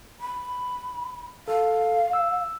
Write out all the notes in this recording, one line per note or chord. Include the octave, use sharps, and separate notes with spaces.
B5
A4 F5
E6